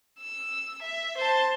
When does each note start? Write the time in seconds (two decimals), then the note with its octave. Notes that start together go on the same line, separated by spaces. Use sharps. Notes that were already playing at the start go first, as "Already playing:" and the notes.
0.20 E6
0.82 E5
1.17 C5 A5